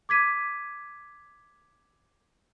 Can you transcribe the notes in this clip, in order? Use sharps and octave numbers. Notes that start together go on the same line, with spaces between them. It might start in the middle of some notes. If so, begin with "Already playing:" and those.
D6 G#6 B6 D#7